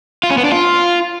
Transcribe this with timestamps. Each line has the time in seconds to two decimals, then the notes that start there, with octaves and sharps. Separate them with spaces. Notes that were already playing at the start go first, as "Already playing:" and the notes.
0.23 F4
0.31 C#4
0.38 B3
0.45 D4
0.52 F4